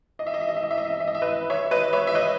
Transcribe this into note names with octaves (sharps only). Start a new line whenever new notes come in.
D#5
E5
D#5
E5
D#5
E5
D#5
E5
D#5
E5
D#5
E5
D#5
E5
B4 D#5
C#5 E5
B4 D#5
C#5 E5
E5
B4 D#5